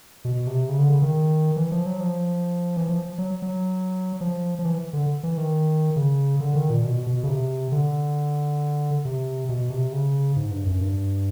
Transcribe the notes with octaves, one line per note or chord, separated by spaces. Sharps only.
B2
C3
C#3
D3
C#3
D#3
E3
F3
F#3
F3
E3
F3
F#3
F#3
F3
F3
E3
D3
E3
D#3
C#3
D3
D#3
A#2
B2
B2
C#3
C3
D3
C3
B2
C3
C#3
G#2
G2
F#2
G2